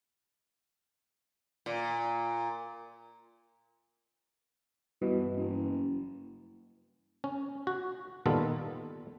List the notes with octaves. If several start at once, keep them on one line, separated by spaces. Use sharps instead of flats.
A#2
G2 B2 E3
F#1
C#4
F#4
A#2 D#3 G3 B3 F4 A4